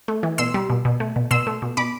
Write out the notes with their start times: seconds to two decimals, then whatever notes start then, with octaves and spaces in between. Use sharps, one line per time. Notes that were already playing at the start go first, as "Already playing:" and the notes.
0.08 A3
0.23 E3
0.38 B2 C6 E6
0.54 G3
0.70 B2
0.85 B2
1.00 A3
1.16 B2
1.31 B2 C6 E6
1.47 A3
1.62 B2
1.77 B2 B5 D6